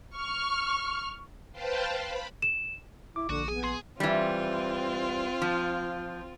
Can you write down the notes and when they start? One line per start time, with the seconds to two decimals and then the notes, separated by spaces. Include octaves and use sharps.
0.16 C#6 F6
1.52 B4 C5 F5 G5 A5
1.95 B5
2.42 E7
3.16 E4 D6
3.29 A#1 D3 F#4
3.48 B3 G#4 G#5
3.64 G#4 C6
4.00 E3 G3 C4 F4
5.42 F3